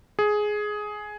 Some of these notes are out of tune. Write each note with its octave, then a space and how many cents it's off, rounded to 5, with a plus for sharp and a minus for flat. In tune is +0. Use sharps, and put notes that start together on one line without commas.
G#4 +10